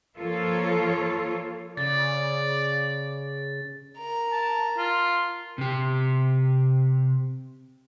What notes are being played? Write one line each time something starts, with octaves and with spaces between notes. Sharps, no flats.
F3 A#3 F4 A4 C#5
C#3 D5 A6
A#4 A#5
A5
F4
C3 G4